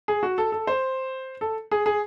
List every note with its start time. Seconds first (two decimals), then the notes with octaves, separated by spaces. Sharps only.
0.08 G#4
0.23 F#4
0.38 A4
0.52 A4
0.67 C5
1.41 A4
1.71 G#4
1.86 G#4